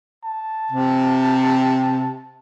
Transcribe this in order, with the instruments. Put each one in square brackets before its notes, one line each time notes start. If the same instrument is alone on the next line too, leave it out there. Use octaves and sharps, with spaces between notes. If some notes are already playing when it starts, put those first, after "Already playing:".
[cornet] A5
[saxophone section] C3